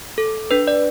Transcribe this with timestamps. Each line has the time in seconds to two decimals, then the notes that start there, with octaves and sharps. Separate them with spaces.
0.18 A4
0.51 D4 B4
0.68 D5